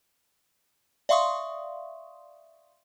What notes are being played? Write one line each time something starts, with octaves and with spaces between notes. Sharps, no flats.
D5 E5 F5 C6 C#6 D#6